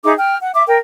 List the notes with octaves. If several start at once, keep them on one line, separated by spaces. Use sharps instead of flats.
D#4 G#4 E5 D6
G5 F6
F#5
E5 D6
A#4 G5